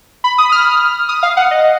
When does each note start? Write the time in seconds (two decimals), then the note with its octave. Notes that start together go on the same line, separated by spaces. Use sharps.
0.24 B5
0.38 D#6
0.52 F6
1.09 D#6
1.23 F5
1.37 F#5
1.51 D#5